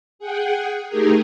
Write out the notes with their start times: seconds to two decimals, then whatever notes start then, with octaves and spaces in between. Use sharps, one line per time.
0.19 G#4 F#5 G5
0.88 A3 D#4 G4 G#4 A#4